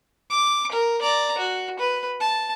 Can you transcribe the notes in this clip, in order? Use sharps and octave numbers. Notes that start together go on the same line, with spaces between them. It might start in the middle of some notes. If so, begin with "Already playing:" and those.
D6
A#4
D5 A#5
F#4
B4
A5